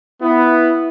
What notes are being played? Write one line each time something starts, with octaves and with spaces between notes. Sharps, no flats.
B3 E4